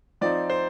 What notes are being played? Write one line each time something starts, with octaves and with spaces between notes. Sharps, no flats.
F3 C4 D#4 D5
C5